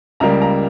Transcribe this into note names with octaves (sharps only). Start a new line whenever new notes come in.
C#2 C#3 G3 A#3 A#5
A#5